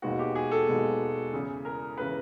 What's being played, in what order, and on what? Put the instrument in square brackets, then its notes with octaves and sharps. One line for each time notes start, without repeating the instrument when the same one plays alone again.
[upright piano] E1 D#2 D#3 G#3 B3 [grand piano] F#4
[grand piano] G4
G#4
A4
[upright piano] E1 D#2 D#3 G#3 B3
E2 C#3 E3
[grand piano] A#4
[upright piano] C#3 E3 [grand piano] B4